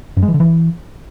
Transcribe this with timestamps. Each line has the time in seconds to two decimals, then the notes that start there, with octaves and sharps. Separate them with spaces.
0.17 F#2
0.22 G#3
0.28 E3
0.34 D3
0.40 E3